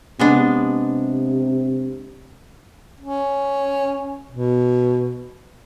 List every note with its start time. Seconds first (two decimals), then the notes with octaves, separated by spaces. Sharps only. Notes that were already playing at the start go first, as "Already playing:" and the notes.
0.19 C3 G#3 B3 D4
3.00 C#4
4.31 B2